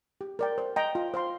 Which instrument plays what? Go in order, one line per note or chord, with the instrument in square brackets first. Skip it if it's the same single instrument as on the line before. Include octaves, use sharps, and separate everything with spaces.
[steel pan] G4
A#4 D5 G5
C5
D#5 G5 A#5
F4
C5 F5 C6